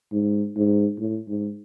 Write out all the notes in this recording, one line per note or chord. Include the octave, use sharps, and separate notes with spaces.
G#2
G#2
A2
G#2